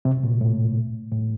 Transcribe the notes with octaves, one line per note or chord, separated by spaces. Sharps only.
C3
A#2
A2
A2